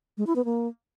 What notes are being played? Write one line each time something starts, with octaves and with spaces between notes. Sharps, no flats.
G#3
E4
B3
A#3